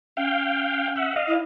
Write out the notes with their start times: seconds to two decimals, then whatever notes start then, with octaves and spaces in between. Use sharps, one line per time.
0.17 C#4 F5 G5
0.96 E5 F#5
1.16 D#5 F5
1.28 E4